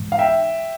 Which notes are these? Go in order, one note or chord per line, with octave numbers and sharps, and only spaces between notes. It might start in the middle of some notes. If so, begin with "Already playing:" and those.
Already playing: G#2 E3 G#3
F5
E5 G5